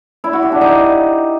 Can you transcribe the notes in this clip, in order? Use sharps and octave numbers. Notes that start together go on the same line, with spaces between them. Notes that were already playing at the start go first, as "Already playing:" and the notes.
E4
F#4
G4
D4
D#4